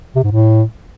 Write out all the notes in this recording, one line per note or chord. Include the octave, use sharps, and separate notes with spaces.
C3
G#2
A2